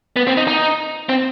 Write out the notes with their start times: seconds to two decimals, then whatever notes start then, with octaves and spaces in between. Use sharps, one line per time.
0.16 B3
0.27 C4
0.37 D#4
0.48 D#4
1.09 C4